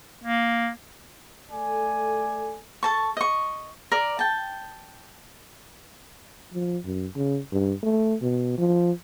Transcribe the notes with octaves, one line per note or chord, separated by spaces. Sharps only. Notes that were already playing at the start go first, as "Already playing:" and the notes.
A#3
A3 A4 D5 G#5
A4 A5 C#6
D#5 C#6
A#4 D5
G5 A5
F3
F#2
C#3
G2
A3
B2
F3